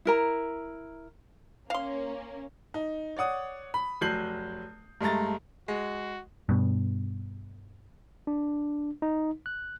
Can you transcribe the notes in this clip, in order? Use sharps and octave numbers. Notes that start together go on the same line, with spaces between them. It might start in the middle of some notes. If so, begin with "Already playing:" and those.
E4 A#4 A#5
A#3 C#4 F5 C6
D#4
C#5 D5 F#5 D#6
B5
F1 F#3 G6 C7 F#7
G2 G#3 A3 A#5 A6
G#3 F#4
G2 B2
D4
D#4
F#6